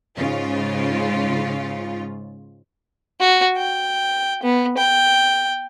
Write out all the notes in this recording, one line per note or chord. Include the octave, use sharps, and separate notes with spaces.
G#2 C#3 F4
F#4
G5
B3
G5